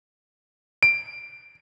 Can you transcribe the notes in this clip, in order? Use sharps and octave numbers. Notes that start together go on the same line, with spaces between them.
D7